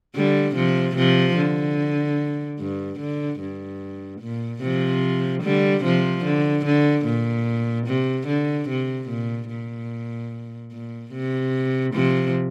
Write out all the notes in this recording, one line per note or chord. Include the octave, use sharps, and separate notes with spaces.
D3 G3
C3 F3
C3 F3
D3
G2
D3
G2
A#2
C3 F3
D3 G3
C3 F3
D3
D3
A#2
C3
D3
C3
A#2
A#2
A#2
C3
C3 F3